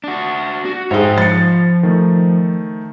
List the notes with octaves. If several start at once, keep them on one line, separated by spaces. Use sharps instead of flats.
D4 F#4
F#4
G#2 G#4 C#5 E5 G5
F3 B5 A6 C#7
D#3 A3